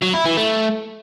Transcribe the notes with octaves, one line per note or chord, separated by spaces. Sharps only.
F#3
E4
E3
A3